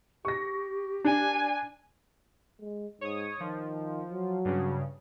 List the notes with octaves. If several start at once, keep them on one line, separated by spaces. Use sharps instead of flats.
G4 C#6 A#6
D4 G#5
G#3
G#2 C#5 D#6
D#3 F3
F#3
G2 C#3